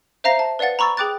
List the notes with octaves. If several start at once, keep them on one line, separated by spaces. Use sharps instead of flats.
C5 E5 F5 A#5 A#6 C7
A5
B4 D5 F5 F#5 A6
A#5 B5 C#6 E6 A6
G#4 G5 D6 F#6 A6